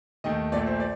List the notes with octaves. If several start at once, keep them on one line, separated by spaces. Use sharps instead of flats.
D#2 D#3 A3 D#5
A#1 A#2 A3 D5
C5
D5